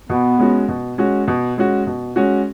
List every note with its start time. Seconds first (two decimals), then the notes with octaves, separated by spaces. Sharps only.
0.09 B2 B3
0.39 G#3 C#4 F#4
0.68 B2
0.98 G#3 C#4 F#4
1.28 B2
1.57 G#3 C#4 F#4
1.87 B2
2.16 G#3 C#4 F#4